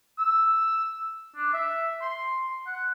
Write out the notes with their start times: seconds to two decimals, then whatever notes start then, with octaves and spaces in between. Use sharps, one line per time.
0.18 E6
1.36 D4
1.53 E5
2.02 C6
2.67 F#5